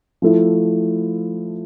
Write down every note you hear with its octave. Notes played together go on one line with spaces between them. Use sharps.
F3 A3 E4